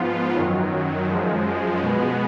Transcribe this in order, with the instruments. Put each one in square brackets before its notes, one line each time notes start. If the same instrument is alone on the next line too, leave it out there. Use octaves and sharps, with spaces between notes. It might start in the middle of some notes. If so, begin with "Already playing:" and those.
Already playing: [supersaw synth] G#2 F3 B3 F4
F#2 D#3 F#3
F#2 F3 G#3
B2 G#3 B3